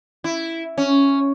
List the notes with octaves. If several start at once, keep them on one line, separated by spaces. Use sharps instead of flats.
E4
C#4